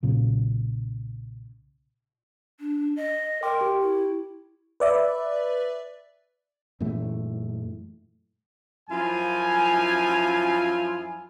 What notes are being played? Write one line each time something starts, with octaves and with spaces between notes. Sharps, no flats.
B1 A#2 C#3
D4
D#5
A#4 G5 C6 D6
G4
E4
B4 D5 E5
F#2 A#2 E3 A3
F#2 F3 E4 F4 G#5